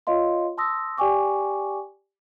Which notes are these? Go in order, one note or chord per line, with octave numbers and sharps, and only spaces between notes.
F4 C#5 D#5 F5 C6
A5 C6 D#6 E6 A#6
G4 D5 G5 G#5 C#6 D6